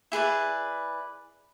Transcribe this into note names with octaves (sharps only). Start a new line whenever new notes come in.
E4 G#4 B4 D5